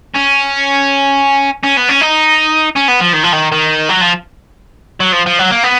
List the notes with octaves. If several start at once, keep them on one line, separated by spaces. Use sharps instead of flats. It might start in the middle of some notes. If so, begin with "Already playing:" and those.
C#4
C#4
B3
C#4
D#4
C#4
B3
F3
D#3
F3
D#3
D#3
F#3
F3
F#3
F3
F3
F#3
A#3
B3